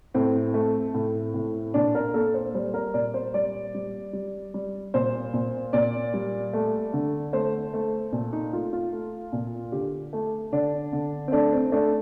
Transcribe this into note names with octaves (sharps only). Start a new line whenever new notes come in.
A2 C4
A3
A2
A2
A#2 D4
A#4
A#3 A4
C5
G3 C5
A#4
A#2 D5
C5
G3 D5
G3
G3
G3
A#2 C5
A#2
A#2 D5
G3
A3
D3
A3 C5
A3
A#2
D#4
A3 F4
F4
A3
A#2
D3 G4
A3
D3 D4
D3
C4
A3 D4
C4
A3 D4